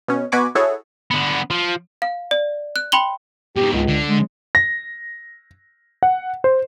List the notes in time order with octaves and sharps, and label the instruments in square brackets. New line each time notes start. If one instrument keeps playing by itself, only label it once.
[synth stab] B2 C#4
B2 F#4 G#5 B5 C#6 D6
E4 F#4 G#4 A4 C#5
[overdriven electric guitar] D3 B3
F3
[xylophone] F5
D5
F#6
G5 B5 C6 F#7 G7
[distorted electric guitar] G#2 B2 [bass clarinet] G4
[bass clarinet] C#2
[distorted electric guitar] D3
[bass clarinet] G#3
[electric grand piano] A#6
F#5
C5